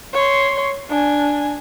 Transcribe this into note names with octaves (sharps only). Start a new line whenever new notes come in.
C#5 C6
D4 G#5